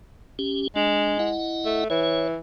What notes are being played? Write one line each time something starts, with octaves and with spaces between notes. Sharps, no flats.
C#4 G4
G#3 D4
E4 D#5 F#5
A3
E3 C#5